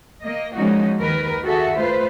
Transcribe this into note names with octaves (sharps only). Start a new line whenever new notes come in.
A#3 D#5
F3 G#3 A#3 C#4 D#4 F#4
D#2 D#3 A#4 B4
F#4 G#4 A4 E5
A3 F4 B4 C5